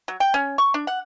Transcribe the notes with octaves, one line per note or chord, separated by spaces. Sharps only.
F#3
G5
C#4
C#6
D4
F#5